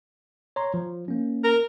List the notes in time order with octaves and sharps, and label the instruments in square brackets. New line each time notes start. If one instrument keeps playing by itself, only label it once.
[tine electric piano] C#5 A#5 C6
F3
A#3 C#4
[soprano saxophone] A#4